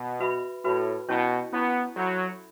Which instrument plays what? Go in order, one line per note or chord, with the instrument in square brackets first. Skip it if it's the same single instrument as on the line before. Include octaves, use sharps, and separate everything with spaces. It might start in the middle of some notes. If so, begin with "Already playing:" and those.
Already playing: [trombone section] B2
[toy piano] F#4 B4 E5 B5
[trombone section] A2 [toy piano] F#4 B4 E5 B5
[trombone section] B2 [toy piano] C#4 E4 C#5 A5 C#6
[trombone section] B3 [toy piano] C#4 E4 C#5 A5 C#6
[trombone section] F#3 [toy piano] A4 C#5 E5 B5